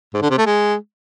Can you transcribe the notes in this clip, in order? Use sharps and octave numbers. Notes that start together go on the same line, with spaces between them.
G#2
D3
C3
A3
G#3